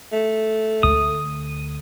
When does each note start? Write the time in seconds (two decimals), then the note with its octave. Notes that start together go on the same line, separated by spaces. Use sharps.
0.12 A3
0.83 D2 D#6